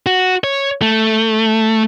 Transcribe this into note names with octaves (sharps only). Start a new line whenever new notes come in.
F#4
C#5
A3